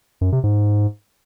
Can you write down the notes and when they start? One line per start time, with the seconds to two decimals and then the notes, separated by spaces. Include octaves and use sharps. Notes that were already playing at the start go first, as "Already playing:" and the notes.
0.21 F#2
0.32 C3
0.44 G#2